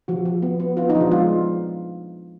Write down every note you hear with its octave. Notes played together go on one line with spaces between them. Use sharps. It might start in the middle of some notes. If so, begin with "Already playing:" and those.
F3 F#4
F3
B3
B3
B3 F4
D#4
F3
D4
G#3 F4